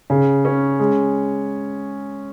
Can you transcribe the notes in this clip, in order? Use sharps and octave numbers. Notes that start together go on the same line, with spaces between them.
C#3
C#4
G#3